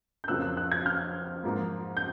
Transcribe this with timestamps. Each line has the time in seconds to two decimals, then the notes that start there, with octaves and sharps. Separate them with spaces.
0.24 G6
0.28 F2 C#3 F3 A#3 E6 F#6
0.42 E6 F#6
0.57 E6 F#6
0.71 F#6 G#6
0.86 F6 G6
1.44 G#2 F3 A#3
1.97 G6